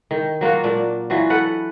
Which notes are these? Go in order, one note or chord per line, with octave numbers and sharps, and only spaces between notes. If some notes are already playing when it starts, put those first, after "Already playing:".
D#3
F#3 A#3 F4 F#4
A#2 D4
E3 F#3 F4 F#4
A4 B4 F#5